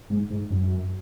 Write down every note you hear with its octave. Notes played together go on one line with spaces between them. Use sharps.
G#2
G#2
F#2